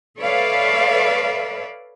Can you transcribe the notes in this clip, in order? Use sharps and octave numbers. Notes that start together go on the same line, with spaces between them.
A4 B4 C#5 D5 E5 F5